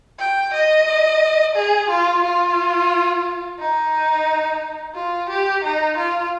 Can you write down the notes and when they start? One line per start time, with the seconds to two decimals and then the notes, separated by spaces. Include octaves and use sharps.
0.19 G5
0.54 D#5
1.56 G#4
1.90 F4
2.24 F4
3.60 D#4
4.95 F4
5.29 G4
5.64 D#4
5.97 F4